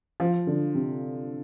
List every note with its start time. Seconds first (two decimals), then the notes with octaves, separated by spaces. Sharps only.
0.20 F3
0.47 D3
0.75 C3